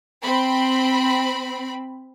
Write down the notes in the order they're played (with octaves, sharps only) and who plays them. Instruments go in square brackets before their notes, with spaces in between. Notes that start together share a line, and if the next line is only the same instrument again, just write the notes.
[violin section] C4 B5